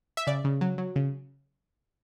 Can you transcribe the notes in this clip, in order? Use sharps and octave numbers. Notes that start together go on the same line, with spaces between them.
E5
C#3 D5
C#3
F#3
F#3
C#3